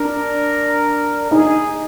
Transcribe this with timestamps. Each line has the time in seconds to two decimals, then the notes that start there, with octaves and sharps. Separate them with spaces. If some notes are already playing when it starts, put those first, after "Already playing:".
Already playing: D4 A#4
1.31 D#4 G#4